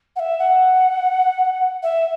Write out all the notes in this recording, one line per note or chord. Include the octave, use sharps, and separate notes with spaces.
F#5
E5
F#5
E5